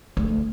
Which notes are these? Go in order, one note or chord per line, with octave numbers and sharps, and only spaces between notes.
D2